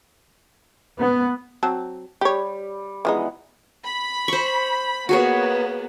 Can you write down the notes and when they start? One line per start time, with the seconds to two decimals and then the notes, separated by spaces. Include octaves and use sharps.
0.99 B3
1.63 F#3 C4 A5
2.21 G3 G4 C#5
3.05 E3 F3 G#3 B3 D#4
3.84 B5
4.28 C5 C#6
5.09 A#3 B3 F#4 G#4 C#5